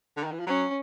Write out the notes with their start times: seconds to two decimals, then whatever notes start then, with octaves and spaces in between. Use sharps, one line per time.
0.17 D3
0.24 D#3
0.32 E3
0.40 F3
0.47 F#3 C#4